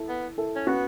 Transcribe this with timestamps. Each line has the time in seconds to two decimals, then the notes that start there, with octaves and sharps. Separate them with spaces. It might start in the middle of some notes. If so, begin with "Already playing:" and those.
Already playing: E4 A4
0.09 B3
0.38 E4 A4
0.56 C#4
0.67 B3 C#4 F#4